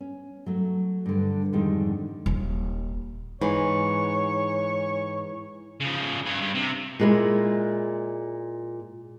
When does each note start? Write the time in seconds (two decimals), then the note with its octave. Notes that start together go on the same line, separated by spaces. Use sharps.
0.01 C#4
0.46 F#3 A3
1.06 G2 D3
1.53 F2 G#2 D3 D#3 G3 G#3
2.26 D#1
3.41 G#2 E3 C#5
5.80 C#3 F3
6.26 G2 G#4
6.41 G2
6.55 C3
7.00 A#2 G#3 E4